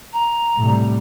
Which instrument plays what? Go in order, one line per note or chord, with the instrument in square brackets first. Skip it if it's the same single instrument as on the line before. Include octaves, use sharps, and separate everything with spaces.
[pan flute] A#5
[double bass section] A2 C3 G3